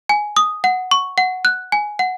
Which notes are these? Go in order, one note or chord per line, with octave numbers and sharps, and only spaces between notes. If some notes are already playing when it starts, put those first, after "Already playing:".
G#5
D#6
F#5
C#6
F#5
F#6
G#5
F#5